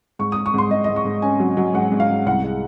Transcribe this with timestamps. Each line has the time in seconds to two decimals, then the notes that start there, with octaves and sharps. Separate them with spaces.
0.19 G#2 C#6
0.32 G#2 D#6
0.46 C#6
0.54 G#2 C6
0.71 G#2 D#5
0.84 D#5
0.89 G#2
0.96 C#6
1.05 G#2
1.22 C#4 G#5
1.40 F#3
1.57 F#3
1.74 G#2 F#5
1.92 G#2
2.00 F5
2.09 G#2
2.26 C2 F#5
2.43 G#3